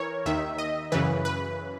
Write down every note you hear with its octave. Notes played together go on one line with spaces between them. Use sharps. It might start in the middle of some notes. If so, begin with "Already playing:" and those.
Already playing: E3 A#4 C#5
D#2 D#3 E5
D#5
F#2 C#3 E3 B4
B4